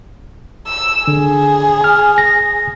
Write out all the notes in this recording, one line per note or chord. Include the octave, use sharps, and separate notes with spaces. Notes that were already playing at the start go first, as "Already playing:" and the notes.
E6
D3 G#4
G#5 F6
A#6